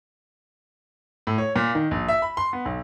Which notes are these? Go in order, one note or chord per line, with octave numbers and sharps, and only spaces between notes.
A2
C#5
A#2
D#3
A#1
E5
B5
C6
B3
B1